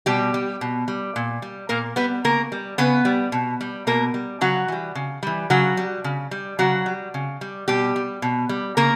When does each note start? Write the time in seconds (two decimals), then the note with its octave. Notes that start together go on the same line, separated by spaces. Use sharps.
0.06 B2 G3 G4
0.34 G3
0.61 B2
0.88 G3
1.16 A#2
1.42 G3
1.69 A#2 A#3 A#4
1.96 G3 B3 B4
2.24 C#3 A#3 A#4
2.52 G3
2.78 C#3 B3 B4
3.05 G3
3.32 B2
3.61 G3
3.87 B2 A#3 A#4
4.14 G3
4.41 C#3 F#3 F#4
4.68 E3 G3
4.95 C#3
5.23 E3 G3
5.50 C#3 F#3 F#4
5.77 G3
6.04 C#3
6.31 G3
6.59 C#3 F#3 F#4
6.86 G3
7.14 C#3
7.41 G3
7.68 B2 G3 G4
7.96 G3
8.22 B2
8.49 G3
8.77 C#3 A#3 A#4